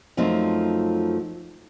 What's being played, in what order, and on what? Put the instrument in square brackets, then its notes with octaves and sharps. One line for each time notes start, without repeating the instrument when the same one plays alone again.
[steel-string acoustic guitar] F#2 F3 A3 C4 D#4